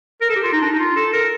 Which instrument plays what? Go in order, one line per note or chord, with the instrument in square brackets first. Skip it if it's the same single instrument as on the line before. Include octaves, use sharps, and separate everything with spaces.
[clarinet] A#4
A4
G4
F4
D#4
D4
D#4
F4
A4
A#4